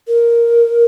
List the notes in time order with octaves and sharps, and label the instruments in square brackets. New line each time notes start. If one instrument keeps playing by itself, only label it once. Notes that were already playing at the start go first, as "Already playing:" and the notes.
[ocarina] A#4